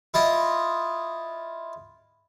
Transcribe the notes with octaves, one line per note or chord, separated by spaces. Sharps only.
E4 F4 D#5